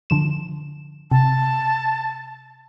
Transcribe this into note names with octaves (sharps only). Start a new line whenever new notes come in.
D3 F3 E7
C3 A5